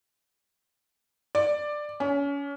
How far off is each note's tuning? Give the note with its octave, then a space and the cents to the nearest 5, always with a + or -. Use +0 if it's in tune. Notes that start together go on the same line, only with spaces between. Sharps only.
D5 +10
C#4 +30